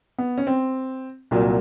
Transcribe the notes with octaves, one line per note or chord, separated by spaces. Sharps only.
B3
C#4
C4
C2 A#2 F#3